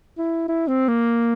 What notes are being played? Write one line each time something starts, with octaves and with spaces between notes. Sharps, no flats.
E4
E4
C4
A#3